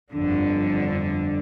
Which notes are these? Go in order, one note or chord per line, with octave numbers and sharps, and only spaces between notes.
G1 F2 D3